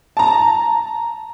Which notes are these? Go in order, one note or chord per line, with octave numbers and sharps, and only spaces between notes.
A5 A#5